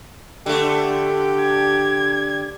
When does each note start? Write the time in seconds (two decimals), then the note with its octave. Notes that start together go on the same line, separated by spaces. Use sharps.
0.46 D3 A3 G4
1.41 G#6